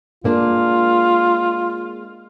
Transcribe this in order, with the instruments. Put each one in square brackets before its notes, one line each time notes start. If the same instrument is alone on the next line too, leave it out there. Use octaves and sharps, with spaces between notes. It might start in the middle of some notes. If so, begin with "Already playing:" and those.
[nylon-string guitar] G#3 A#3 D4 [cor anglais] F4